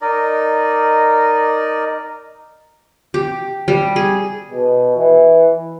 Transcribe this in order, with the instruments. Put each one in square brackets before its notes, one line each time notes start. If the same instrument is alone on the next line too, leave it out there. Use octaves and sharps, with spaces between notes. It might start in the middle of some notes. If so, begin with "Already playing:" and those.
[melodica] D#4 A#4 D5 D#5
[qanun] G4
G3
G#4
[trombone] B2
E3